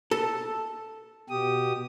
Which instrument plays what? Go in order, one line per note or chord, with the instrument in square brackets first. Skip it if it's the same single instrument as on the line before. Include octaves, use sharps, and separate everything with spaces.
[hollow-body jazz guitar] A4
[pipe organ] B2 G4 D#6